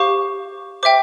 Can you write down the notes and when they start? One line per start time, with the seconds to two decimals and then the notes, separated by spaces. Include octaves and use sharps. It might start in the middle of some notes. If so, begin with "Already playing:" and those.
Already playing: G4 C5 F5 C#6
0.83 C5 E5 G5 D6